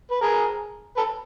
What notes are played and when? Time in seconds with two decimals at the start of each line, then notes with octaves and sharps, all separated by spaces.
0.11 B4
0.21 G#4 A#4
0.97 A4 B4